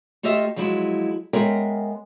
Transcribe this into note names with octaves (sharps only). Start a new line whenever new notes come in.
A3 F4 G4 D#5 E5
F3 F#3 G#3 E4
G#3 B3 C#4 A#4 E5 G5